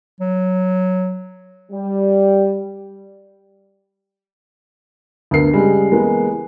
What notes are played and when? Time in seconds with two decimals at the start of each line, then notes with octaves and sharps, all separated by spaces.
0.20 F#3
1.72 G3
5.31 D2 B3 A#4 C7
5.53 C#3 G3 G#3
5.92 E3 G#3 A#3 B3